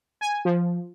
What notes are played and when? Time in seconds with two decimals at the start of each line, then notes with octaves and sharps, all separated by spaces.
0.21 G#5
0.45 F3